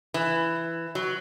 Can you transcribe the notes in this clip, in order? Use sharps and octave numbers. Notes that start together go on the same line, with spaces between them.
E3
F#3